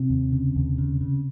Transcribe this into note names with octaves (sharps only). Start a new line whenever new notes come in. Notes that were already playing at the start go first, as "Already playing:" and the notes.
Already playing: C3 C4
D#2
C#3
D#2
C#3
C#3